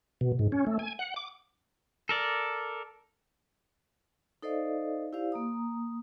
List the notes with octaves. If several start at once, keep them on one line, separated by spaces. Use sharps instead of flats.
B2
G#2
C#4
A3
G#5
F#5
D6
A4 A#4 D5
D#4 A4 C5 D5 D#5 F5
E4 G4 C5 D5 F5
A#3 A#5 D#6